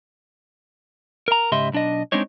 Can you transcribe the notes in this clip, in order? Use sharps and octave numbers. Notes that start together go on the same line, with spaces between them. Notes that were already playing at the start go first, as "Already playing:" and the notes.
A#4 A#5
G#2 C#3 G4 D#5 E5 C6
B1 D4 D#5
G#3 C4 D4 D#4 C#5